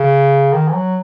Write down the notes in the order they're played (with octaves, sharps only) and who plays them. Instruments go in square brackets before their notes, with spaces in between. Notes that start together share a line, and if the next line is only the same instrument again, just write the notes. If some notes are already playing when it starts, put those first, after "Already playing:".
Already playing: [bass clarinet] C#3
D#3
E3
F#3